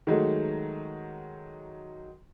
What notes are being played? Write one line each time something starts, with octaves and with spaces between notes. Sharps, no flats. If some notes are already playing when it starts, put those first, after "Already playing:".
D#3 F#3 G#3 A3